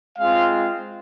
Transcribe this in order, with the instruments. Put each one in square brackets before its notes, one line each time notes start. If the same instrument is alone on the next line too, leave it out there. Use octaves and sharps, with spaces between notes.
[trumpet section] G#3 C4 F4 F5